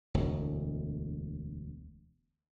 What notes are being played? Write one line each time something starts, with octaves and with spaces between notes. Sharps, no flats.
E1 D2